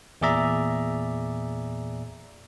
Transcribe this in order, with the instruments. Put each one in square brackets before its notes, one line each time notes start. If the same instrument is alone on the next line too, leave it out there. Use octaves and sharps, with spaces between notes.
[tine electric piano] E2 A#2 G#4 D5 E5 A#5